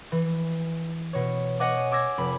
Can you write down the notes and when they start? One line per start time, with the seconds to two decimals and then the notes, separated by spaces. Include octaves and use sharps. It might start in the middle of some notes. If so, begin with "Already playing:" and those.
0.12 E3
1.13 B2 C#5
1.60 C#5 D#5 F#5 G#5 D6
1.92 D6 E6 G#6 A#6
2.18 F1 B5